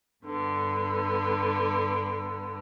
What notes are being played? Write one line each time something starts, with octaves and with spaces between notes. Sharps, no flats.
G2 D3 B3